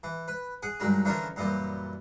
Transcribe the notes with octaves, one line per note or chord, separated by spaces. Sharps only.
E3
B4
G#4 F#5
G2 D#3 F#3 G#3
D3 E3 F3 C#4 F4 A#4
F#2 A#2 E3 G3